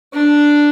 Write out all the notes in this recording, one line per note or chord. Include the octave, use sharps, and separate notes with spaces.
D4